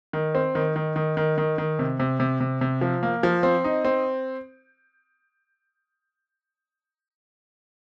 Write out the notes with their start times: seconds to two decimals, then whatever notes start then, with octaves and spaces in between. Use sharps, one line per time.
0.13 D#3
0.35 C4
0.55 D#3
0.76 D#3
0.96 D#3
1.17 D#3
1.38 D#3
1.58 D#3
1.79 C3
2.00 C3
2.20 C3
2.40 C3
2.61 C3
2.81 F3
3.03 A#3
3.23 F3
3.43 C4
3.64 D#4
3.85 C4